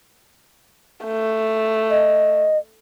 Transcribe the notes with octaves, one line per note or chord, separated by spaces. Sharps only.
A3
D#5